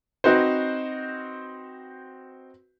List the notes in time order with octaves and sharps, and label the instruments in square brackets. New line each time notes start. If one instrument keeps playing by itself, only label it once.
[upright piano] C4 D#4 F#4 B4 C5